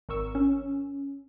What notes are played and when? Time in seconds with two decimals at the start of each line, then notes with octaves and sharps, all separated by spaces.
0.09 G#1 A#4 C#6 E6
0.35 C#4